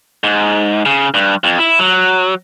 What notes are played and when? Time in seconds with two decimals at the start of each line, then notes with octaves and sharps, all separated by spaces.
0.24 G#2
0.86 C#3
1.14 G2
1.44 F2
1.59 E4
1.79 F#3